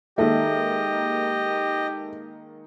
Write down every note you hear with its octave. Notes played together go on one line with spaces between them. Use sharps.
D#3 G#3 A#3 G4 A4 D#5 E5